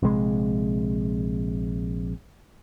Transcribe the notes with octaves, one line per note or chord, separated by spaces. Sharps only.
A#1 C3 G#3